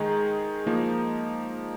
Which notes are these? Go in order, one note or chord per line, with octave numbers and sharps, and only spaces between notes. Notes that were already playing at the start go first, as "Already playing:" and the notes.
Already playing: D#3 G#3 D#4 G#4
F3 A#3 D#4